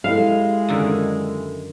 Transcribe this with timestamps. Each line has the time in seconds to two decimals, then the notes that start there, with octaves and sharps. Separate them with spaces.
0.04 G#3 E4 G4 A4 F5
0.69 F#2 D3 D#3